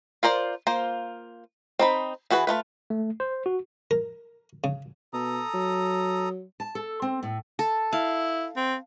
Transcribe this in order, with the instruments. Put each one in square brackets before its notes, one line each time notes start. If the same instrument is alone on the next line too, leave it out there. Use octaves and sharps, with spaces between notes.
[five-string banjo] F4 A#4 C5 D5
A#3 F4 C5
C4 D#4 B5
E3 F#4 G#4 B4
A3 F4 B4
[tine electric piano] A3
C5
F#4
[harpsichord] A#4
C#3
[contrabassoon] B2 [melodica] A4 A#5 D#6
[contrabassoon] F#3
[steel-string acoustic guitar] A5
A4
C4
A2
[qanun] A4
[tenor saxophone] E4 [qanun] F5
[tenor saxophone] C4